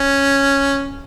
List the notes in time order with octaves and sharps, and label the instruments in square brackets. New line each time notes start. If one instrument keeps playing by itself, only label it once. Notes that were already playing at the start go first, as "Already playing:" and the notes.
Already playing: [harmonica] C#4